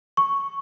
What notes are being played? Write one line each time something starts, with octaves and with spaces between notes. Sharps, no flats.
C#6